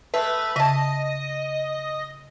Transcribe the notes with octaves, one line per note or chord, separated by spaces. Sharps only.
G#3 A3 B4
C#3 D#5 E5 A5